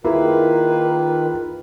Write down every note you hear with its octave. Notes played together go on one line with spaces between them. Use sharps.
D#3 A#3 E4 F4 G#4 B4